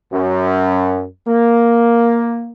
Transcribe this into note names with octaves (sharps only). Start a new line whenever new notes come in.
F#2
A#3